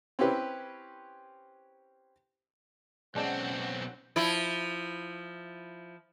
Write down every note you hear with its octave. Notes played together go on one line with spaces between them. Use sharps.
C4 C#4 E4 G4 B4
B1 G#3 C4 C#4 D5 F#5 A5
F3 E4